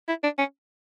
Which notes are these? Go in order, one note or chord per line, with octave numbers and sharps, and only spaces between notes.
E4
D4
C#4